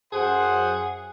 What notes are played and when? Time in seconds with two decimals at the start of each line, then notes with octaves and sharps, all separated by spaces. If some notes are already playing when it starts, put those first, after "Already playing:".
0.12 F#2 G#4 C5 F#5